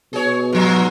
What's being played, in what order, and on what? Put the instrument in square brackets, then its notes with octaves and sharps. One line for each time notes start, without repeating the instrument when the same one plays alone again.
[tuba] B2 [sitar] G#4 C#5
[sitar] G#2 F3